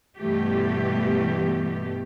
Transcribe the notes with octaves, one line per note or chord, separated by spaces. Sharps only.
G2 B2 E3 A3 G4